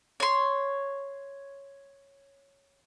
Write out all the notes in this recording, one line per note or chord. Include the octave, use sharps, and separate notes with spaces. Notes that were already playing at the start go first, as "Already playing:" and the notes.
C#5 C6